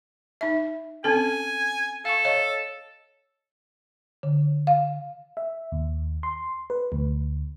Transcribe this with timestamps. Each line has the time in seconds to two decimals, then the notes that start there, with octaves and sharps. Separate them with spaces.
0.41 D#4 E5
1.04 C4 C#4 A4 G#5
2.05 A4 F5 C#6
2.25 C#5 D#5 F5
4.23 D3
4.67 F5
5.37 E5
5.72 D#2
6.23 C6
6.70 B4
6.92 D2